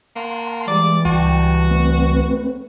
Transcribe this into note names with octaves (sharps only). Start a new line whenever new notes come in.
A#3 F#5 A5 C6
E3 G3 G#3 D5
C#2 F#4 G5 A5
A3 C4 B4